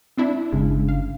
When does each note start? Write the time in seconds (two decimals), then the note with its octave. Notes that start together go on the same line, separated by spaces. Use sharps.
0.17 C4 D4 E4
0.52 G1 C#3 G#3 D4
0.89 F5